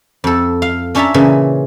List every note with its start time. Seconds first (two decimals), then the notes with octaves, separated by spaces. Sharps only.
0.24 F2 A4
0.62 F5
0.95 C#4 D4 C#5 E5 A5 A#5
1.14 A#2 C#3 E3